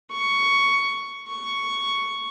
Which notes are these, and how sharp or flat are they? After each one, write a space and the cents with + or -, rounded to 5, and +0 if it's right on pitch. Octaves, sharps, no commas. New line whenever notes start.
C#6 +10
C#6 +5